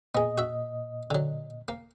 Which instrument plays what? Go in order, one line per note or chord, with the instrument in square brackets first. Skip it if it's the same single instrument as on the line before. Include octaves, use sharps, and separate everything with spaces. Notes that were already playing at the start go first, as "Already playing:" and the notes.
[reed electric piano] A#2 D#5 [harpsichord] B3 G#4
[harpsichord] F#4 E5
D3 F#3
A#3